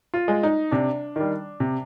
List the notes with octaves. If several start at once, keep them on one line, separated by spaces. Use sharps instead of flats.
F4
G#3
D#4
C3 D4
D#3 G3
C3